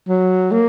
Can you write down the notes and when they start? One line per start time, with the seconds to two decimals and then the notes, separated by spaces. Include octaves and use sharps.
0.08 F#3
0.52 A#3